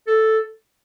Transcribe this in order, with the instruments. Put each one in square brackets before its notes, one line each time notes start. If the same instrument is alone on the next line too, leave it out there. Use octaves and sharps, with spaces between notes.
[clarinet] A4